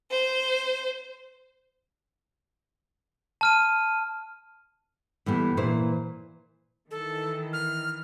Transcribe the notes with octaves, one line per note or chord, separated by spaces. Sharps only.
C5
A5 F6 D#7
A2 E3 G3 B3
A#2 E3 C5
D#3 E3 A4
F6